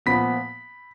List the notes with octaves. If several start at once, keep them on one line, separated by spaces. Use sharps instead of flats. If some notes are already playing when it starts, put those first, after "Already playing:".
A#2 F3 B3 B5 B6